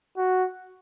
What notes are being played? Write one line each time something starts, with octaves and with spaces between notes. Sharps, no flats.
F#4